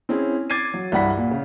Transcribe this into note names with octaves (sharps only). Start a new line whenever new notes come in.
C4 C#4 E4 G#4
D6 G#6 A6 C7 D#7
F#3
C2 G2 F#5 B5 B6
A#2
C#3